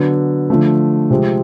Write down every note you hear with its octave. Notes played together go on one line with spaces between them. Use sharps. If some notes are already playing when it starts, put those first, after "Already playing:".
Already playing: D3 F#3 B3
D3 F3 A3
C3 F3 G#3 C4